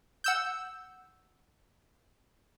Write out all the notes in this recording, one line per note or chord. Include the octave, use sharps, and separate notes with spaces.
F#5 E6 G6